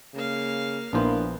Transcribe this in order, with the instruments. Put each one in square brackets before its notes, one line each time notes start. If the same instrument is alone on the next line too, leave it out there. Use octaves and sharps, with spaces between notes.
[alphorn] C#3 [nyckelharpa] A#3 F5
[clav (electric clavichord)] A#1 C5 [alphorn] A#3 [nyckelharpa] B3 [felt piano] D4 E4